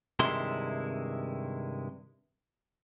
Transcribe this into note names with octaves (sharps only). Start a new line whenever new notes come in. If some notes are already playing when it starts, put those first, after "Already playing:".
G2 C3 D#3 G#3 E4 C6